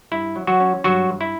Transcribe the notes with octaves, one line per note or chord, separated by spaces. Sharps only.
G2 E4
F#3
F#3 F#4
C#4
G2 F#3 F#4
G2
E4